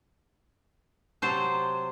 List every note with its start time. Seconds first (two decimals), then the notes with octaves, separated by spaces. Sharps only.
1.22 C3 F#3 C5 A5